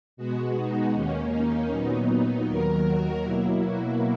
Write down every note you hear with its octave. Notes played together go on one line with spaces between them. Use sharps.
B2 G#3 B3 F#4
D#4
D#2 D#3 A#3 C#4
D#4
A#2 F#3 B3
D#2 D#3 F#3 A#4
F#4
B2 F#3 A#3 E4
F#4